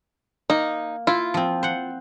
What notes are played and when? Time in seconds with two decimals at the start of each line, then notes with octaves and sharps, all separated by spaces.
0.50 A#3 D#4
1.07 E4 F4
1.34 F3 C4
1.63 C5 F#5